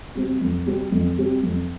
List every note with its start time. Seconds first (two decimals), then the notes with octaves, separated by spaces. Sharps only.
0.15 C3 G3 C4
0.41 F2
0.66 C3 G3 C4
0.92 F2
1.18 C3 G3 C4
1.43 F2